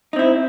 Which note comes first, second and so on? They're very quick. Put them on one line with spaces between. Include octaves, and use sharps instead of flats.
D#4 C4 E4